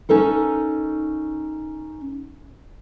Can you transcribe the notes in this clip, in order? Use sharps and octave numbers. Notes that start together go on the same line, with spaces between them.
C#4 D#4 A4 A#4